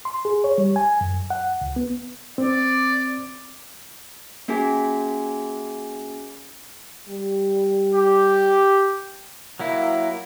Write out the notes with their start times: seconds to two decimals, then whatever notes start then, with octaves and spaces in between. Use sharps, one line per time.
0.05 C6
0.25 G#4
0.44 C#5
0.58 G3
0.76 G#5
1.01 F#2
1.30 F#5
1.61 C#2
1.76 B3
2.38 C4 D5
4.48 A#3 C#4 F#4 G#4 G#5
7.08 G3
7.95 G4
9.60 F#3 A#3 E4